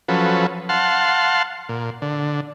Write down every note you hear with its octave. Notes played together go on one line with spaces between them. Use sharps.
F3 F#3 C#4 A4 B4
F5 F#5 A5 C6
A#2
D3